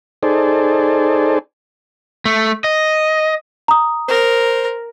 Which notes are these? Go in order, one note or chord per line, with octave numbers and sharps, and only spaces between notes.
D#4 G#4 A4 C5 D5
A3
D#5
A#5 D#6
A#4 C5